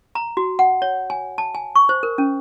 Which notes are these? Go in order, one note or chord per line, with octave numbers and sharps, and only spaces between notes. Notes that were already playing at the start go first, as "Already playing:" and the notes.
A#5
F#4
F#5
C#5
G#5
A5
G#5
C#6
C5
A#4
C#4